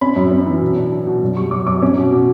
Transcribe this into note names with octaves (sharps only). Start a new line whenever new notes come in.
C#4 B5
F#2
C#4
E3
B2
D4
D4
B2
F#2
G3 C#6
F#2 D6
F#2 D6
C#4
B2
B2